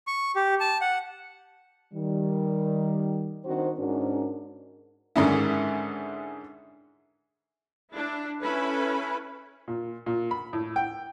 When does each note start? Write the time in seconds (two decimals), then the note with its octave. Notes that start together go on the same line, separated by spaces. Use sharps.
0.07 C#6
0.36 G4
0.60 A5
0.81 F#5
1.93 D#3 G3
3.45 D#3 C4 D4 F#4 C5
3.78 G#2 C#4 D4 F#4 A#4
5.16 G#2 D3 D#3 C#4 D4 E4
7.91 D4 E4
8.41 C#4 E4 A4 B4 B5
9.68 A#2
10.06 A#2
10.31 B5
10.53 A2
10.76 G5